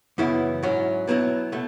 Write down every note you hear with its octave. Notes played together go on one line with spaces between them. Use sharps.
F#2 C#3 E3 B3 E4
G#2 F#3 C#4 E4
B2 F#3 B3 E4
B2 A3